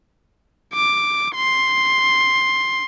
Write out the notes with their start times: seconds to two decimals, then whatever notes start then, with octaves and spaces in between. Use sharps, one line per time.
0.74 D6
1.36 C6